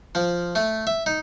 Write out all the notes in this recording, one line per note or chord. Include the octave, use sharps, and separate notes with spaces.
F3
A3
E5
D#4